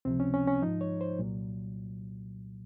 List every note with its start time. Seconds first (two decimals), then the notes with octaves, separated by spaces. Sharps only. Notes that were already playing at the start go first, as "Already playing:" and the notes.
0.05 C#2 C3 F3 C4
0.20 C#4
0.34 C#4
0.48 C#4
0.62 G#2 F3 D#4
0.81 C#5
1.01 C5
1.19 C2 A#2 F#3